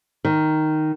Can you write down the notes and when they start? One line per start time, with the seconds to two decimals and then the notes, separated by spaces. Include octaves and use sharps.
0.25 D#3